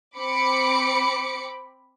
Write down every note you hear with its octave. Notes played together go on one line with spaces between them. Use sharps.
C4 B5 D6 C#7